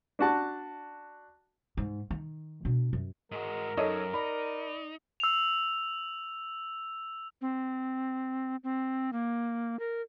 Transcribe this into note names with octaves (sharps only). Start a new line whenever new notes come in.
D4 F#4 A5
G#2
D#3
B2 D4
F#2
G#2 G#3 F#4 A#4
F#2 D#4 A4 C#5 D#5
D#4 D5 B5
E6 F7
C4
C4
A#3
A#4